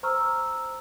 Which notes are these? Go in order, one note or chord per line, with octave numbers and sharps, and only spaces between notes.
C5 A#5 C#6 E6 F6